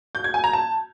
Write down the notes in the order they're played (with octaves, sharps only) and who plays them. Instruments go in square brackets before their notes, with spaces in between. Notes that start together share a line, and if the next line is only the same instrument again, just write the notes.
[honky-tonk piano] G6
G#6
G#5
A#5
A5